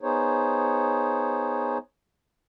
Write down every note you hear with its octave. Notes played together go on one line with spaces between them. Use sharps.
B3 D#4 G#4 C5 C#5